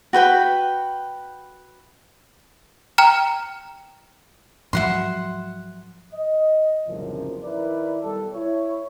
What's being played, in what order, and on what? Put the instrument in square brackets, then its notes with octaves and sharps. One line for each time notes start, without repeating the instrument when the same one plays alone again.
[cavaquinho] F#4 B4 G5 B5
[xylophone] G5 A#5 F6
[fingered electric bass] G#2 F3 F#3 [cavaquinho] E5 F#5 C6
[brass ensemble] D#5
G1 C2 F#2 A#2 C#3 F3
D#3 E4 A#4 B4 D5
B1 G3 G4 A4
E4 C#5